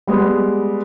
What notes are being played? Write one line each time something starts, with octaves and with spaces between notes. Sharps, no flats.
G3 G#3 B3